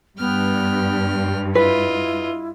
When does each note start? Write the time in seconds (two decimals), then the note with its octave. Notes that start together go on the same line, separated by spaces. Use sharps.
0.19 G2 B3 G5 F6
1.55 E4 F4 B4 D#5